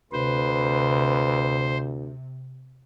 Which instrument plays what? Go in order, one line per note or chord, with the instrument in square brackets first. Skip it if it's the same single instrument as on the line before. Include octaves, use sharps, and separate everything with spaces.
[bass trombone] D2 [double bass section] C3 [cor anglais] B4 [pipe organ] C5